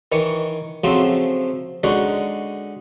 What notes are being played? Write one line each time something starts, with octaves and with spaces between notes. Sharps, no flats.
D#3 E3 C#5 C#6
C#3 F3 F#3 A3 C4
D3 G#3 C#4 D#4 F#4